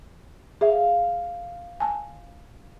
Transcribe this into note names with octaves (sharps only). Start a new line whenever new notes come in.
G#4 E5 F5
G#5 A5